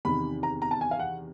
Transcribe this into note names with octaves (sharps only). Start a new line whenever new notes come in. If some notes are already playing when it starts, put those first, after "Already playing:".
E2 C3 D#3 B5
A#5
A#5
A5
G#5
F5
F#5